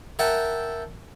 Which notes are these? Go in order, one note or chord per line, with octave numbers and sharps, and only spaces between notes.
A#4 E5 F#5 G5 A5